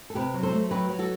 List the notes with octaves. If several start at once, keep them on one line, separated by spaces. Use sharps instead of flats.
A4
C3 G4 B4
F#3
A4 C5
A3
F#3 G4 B4
F#3
F#4 A4